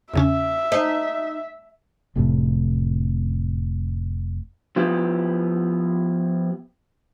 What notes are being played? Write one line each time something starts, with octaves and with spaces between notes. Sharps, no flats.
E2 C#3 C#4 E5
D#4 C5
F1 A2 C3
F3 B3 E4 G4